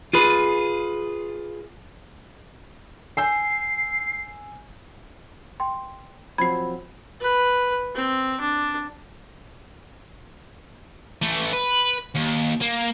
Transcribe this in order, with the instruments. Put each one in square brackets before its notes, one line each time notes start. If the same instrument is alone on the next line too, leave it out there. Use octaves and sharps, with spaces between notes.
[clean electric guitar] F4 G#4 B4
[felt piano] G#5 E6 G6 [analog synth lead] C7
[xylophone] G5 C6
[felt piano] F3 F#3 C4 [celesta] B5 [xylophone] G#6 C7
[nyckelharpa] B4
C4
D4
[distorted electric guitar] E3 A3
B4
D#2
A#3